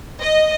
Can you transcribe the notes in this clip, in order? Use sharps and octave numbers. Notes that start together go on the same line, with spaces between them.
D#5